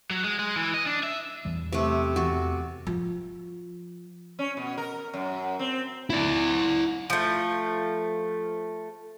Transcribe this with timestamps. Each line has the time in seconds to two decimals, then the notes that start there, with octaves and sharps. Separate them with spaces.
0.10 F#3
0.24 G#3
0.39 G#3
0.56 E3
0.74 D#5
0.86 D4
1.03 E5
1.45 E2 E3 G3
1.72 C3 A3
2.16 E2 F#4 A4
2.87 F3
4.39 C#4
4.57 B2
4.78 A#4
5.13 F#2
5.59 C4
6.10 E4 D5
7.10 F3 A3